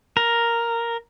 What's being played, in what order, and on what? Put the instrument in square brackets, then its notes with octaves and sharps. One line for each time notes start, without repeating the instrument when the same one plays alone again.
[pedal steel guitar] A#4